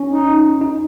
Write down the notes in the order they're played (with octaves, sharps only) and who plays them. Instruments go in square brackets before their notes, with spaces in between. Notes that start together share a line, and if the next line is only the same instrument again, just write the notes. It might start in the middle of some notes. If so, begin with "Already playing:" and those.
Already playing: [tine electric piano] C#4
[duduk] D#4
[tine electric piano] D#4